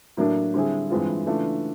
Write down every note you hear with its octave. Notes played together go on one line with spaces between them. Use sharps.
A2 F#3 A#3 D4
D3 G3 C4 E4 G#4
G2 E3 G#3 C4 F4
C#3 E3 A3 D4 F4